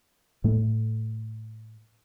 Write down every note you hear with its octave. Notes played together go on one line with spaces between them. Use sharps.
A2 A3